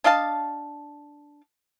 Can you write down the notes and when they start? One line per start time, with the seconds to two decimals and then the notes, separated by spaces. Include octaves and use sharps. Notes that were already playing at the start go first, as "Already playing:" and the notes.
0.04 D4 D#5 F5 A5